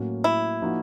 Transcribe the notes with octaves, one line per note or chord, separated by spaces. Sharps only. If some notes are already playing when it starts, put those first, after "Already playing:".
Already playing: A2 F#3 A#3 C#4 F#4
E4
F3 A#3 D#4 F#4